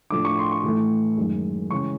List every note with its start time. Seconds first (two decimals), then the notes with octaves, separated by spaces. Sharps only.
0.10 A2 F3 A3 D4 D6
0.25 C#6
0.39 C6
0.52 C#6
0.64 A2 E3 A3
1.17 F#2 D#3 G#3
1.71 C#3 E3 G#3 C#4 C#6